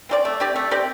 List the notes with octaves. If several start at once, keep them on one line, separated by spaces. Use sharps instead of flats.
C4 G4 D5
A3
C4 G4 D5
A3
C4 G4 D5